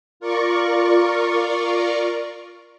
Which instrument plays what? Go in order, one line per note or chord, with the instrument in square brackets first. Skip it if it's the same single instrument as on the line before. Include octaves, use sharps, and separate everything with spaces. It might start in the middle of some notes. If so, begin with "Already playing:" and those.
[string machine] F4 A#4 D5 C#6